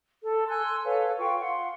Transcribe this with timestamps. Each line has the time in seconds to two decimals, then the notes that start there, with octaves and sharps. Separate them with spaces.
0.22 A4
0.48 G#5 C6 E6 F#6
0.85 A4 B4 C#5 F5
1.18 F4 F5 G5 C#6
1.39 F5 F#5 C6